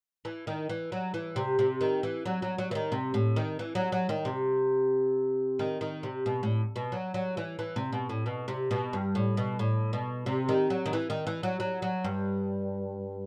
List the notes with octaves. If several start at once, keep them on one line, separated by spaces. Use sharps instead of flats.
E3
D#3
E3
F#3
E3
C3
C3
D#3
E3
F#3
F#3
F#3
E3
D#3
C3
A2
D#3
E3
F#3
F#3
D#3
C3
D#3
D#3
C3
B2
A2
B2
F#3
F#3
E3
E3
C3
B2
A2
B2
C3
B2
G2
A2
B2
A2
B2
C3
D#3
F#3
D#3
E3
D#3
E3
F#3
F#3
F#3
G2